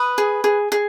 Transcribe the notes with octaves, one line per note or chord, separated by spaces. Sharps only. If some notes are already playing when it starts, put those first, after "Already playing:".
Already playing: B4 D#6
G#4
G#4
G#4